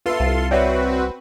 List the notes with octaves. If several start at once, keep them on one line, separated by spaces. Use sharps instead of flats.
F4 A4 B4 E5 C6
C2
C4 F#4 B4 C#5 D5 E5